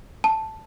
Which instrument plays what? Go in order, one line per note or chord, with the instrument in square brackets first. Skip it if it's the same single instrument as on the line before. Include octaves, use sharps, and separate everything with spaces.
[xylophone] A5